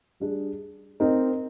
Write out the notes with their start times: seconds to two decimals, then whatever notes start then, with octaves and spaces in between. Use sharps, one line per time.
0.20 G3 D4 G#4
1.00 C4 D#4 A#4 D#5